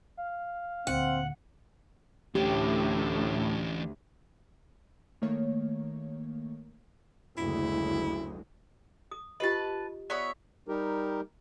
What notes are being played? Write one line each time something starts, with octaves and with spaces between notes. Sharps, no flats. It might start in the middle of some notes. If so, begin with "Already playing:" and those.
F5
D2 A#2 C4 F#5
D2 A2 E3 C#4 G4
D#3 A3 A#3 C#5
F#1 D2 G#3 E4
D#6
F4 G4 B4 D#5 A5
B3 C#5 D5 E5
G3 D#4 G4 A#4